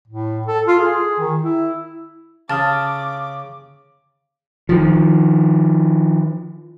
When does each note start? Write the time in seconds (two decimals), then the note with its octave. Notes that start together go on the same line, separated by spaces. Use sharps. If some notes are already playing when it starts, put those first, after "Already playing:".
0.08 A2
0.47 A4
0.67 F4
0.79 G#4
1.19 D#3
1.42 E4
2.50 C#3 A5 D6 D#6 F6 A6
4.69 D#3 F3